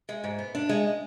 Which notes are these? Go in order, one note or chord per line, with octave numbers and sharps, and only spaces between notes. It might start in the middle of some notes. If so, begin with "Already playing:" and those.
G#3
G#2
B3
D4
G#3